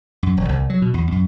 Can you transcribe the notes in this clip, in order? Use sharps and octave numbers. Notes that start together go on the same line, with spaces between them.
F#2
E1
C2
F#3
B2
E2
F#2